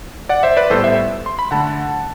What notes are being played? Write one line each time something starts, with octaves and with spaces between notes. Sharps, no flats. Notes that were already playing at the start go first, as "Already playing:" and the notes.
D5 F#5
C5 E5
B4 D5
A2 G3 B3 A4 C5
C5 E5
C6
B5
D3 A3 F#5 A5